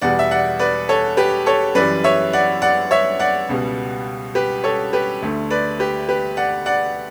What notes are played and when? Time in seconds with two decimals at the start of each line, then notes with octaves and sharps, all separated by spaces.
0.02 E2 B2 G3 D5 F#5
0.19 E5
0.31 D5 F#5
0.59 B4 D5
0.89 A4 C#5
1.17 G4 B4
1.46 A4 C#5
1.75 F#2 E3 G3 B4 D5
2.04 C#5 E5
2.33 D5 F#5
2.62 D5 F#5
2.91 C#5 E5
3.19 D5 F#5
3.49 C#2 B2 G3
4.35 G4 B4
4.64 A4 C#5
4.93 G4 B4
5.22 D2 D3 A3
5.51 B4 D5
5.79 G4 B4
6.09 G4 B4
6.37 D5 F#5
6.66 D5 F#5